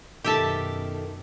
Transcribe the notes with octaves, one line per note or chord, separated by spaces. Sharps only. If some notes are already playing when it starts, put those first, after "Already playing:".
F#2 B2 D#3 G4 A4 E5 A5